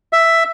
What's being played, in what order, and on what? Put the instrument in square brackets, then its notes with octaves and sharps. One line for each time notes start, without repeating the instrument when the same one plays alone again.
[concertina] E5